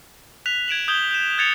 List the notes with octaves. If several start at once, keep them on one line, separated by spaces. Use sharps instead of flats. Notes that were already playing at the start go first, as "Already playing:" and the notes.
F#6 B6 F7
G#6 D7 E7 F#7
D#6 G6 G#6 G7
G6 E7
F#6 G#6 A6 C#7 F7